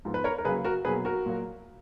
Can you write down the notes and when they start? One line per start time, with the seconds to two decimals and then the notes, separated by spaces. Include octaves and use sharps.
0.05 G#2 F3 B3
0.14 B4
0.24 A#4 C#5
0.38 A#4
0.45 C#3 F#3 A#3 G#4 B4
0.64 F#4 A#4
0.85 B2 F#3 A#3 G#4 B4
1.05 F#4 A#4
1.26 A#2 F#3 A#3